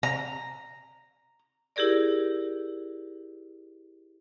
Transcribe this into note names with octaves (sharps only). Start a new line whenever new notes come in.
A#5
E4 G4 G#4 A#4 D5